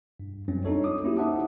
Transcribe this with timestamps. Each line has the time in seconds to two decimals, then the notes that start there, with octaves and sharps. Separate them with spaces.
0.20 G2
0.48 F#2 F#3 G3 C4 C#4
0.65 D4 D#4 F4 A4 C#5
0.84 D6 D#6
1.03 A#3 C#4 E4 F#4 G4
1.17 D#4 C5 E5 F#5 A5 D#6